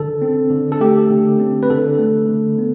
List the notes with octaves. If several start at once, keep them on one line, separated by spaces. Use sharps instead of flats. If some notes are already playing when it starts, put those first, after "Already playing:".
Already playing: D3 A4
C4
D3
A4
A3 G4
D3
C4
B4
D3 A4
A3
D3
B3